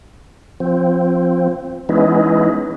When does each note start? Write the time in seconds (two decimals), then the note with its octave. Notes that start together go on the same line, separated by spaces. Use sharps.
0.60 F3 C4
1.89 E3 G#3 B3 C#4 D#4 E4